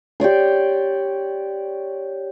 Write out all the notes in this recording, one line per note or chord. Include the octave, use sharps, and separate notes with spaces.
G4 C#5 D5 C6